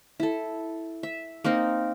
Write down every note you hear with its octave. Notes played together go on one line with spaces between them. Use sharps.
E4 A4
E5
A#3 C4 D#4 A#4